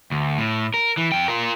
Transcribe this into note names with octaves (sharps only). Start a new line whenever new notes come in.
D2
A2
A#4
E3
F2 G5
F4 A#4